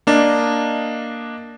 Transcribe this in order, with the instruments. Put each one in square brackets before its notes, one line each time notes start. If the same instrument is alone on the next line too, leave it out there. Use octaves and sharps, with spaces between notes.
[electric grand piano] A#3 D4 D#5